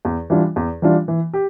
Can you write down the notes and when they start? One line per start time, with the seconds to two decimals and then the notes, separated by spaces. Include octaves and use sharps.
0.05 E2
0.30 E3 G3 D4 F4
0.56 E2
0.82 E3 G3 D4 F4
1.08 E3
1.34 G4